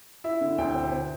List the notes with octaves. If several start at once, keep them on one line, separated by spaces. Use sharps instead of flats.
E4 E5
D3
D2 G5
C4
C4